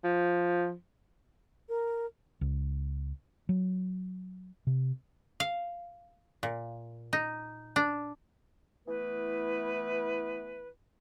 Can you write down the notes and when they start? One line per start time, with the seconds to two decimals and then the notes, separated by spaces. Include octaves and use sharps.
0.04 F3
1.69 A#4
2.41 C#2
3.49 F#3
4.67 C3
5.40 F5
6.43 A#2
7.13 D#4
7.76 D4
8.87 E3 A3 B3 E4 B4